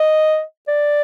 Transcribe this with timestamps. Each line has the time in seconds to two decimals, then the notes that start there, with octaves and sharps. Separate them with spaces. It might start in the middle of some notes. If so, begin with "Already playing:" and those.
Already playing: D#5
0.68 D5